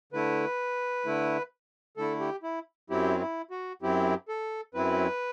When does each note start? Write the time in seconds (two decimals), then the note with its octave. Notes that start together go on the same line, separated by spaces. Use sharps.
0.13 D3 A3 E4 B4
1.05 D3 A3 E4
1.97 D3 A3 E4 A4
2.20 G4
2.43 E4
2.90 F#2 F#3 C4 E4 G4
3.20 E4
3.51 F#4
3.82 F#2 F#3 C4 E4 G4
4.29 A4
4.74 F#2 F#3 C4 E4 B4